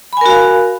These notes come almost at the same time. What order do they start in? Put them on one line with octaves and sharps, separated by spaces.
B5 G#5 A#4 F#4 F5